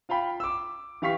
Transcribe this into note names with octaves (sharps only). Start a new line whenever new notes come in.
F4 F5 G5 B5
D6 E6
E3 G4 F5 C#6 B6